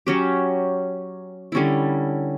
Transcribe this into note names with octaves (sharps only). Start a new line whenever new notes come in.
F#3 C#4 G4
D3 G3 C#4 E4